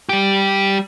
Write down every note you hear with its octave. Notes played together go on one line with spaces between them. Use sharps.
G3 G4